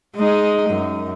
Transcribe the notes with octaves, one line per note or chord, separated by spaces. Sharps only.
G#3 D#4
F#2